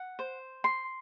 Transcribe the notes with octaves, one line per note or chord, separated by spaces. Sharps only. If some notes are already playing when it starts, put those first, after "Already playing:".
Already playing: F#5
C5
C6